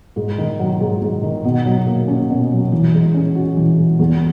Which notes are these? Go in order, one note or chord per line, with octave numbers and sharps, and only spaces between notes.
G#2
D#3
F#3
G#2
G#2
D#3
B2
F#3
A#3
C#4
B2
F#3
E3
G#3
C#4
F#4
E3
G#3
E2